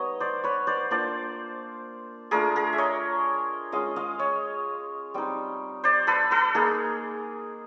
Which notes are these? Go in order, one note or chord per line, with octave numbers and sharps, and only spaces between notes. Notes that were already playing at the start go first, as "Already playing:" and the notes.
Already playing: G3 B3 D#4 C#5 D#5
C5 D5
B4 C#5
C5 D5
A#3 D4 F4 C5 D5
A3 D4 F4 G#4 A#4
G#4 A#4
E5
C#5 D#5
G#3 C#4 F4 D#5 F5
D#5 F5
C#5 D#5
G3 C4 D#4
C5 D5
A4 B4
A4 B4
A#3 D#4 G#4 A#4